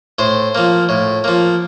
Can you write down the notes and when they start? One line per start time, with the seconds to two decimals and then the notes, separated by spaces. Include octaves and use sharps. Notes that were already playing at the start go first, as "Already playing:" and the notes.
0.19 A2 C5
0.55 F3 A#3
0.89 A2
1.24 F3 A#3